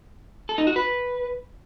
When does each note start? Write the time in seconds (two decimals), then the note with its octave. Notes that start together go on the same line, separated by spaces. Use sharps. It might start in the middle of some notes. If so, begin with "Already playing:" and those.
0.49 A4
0.58 D#4
0.67 F#4
0.76 B4